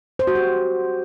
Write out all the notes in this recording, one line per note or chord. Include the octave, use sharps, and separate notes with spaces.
C5
F#4
G4